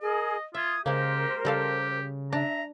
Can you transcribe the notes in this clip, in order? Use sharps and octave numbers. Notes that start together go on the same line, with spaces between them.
G#4 A#4 D#5
F4 E5 D#6 G#6
C#3 G#3 A#3 G4 A#4 C5
C#3 G3 G4 A4 F5
D4 E5 A#5